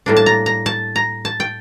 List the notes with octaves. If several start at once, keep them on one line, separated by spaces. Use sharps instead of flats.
A2 G3 A#3 D4
A5
A#5
A#5
A5
A#5
A5
G5